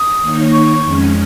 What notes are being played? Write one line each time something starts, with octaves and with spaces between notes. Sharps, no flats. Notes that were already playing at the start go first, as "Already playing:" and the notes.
Already playing: D#6
D#3 A#3 D#4 C#5
C#6
F2 D#3 G#3 C#4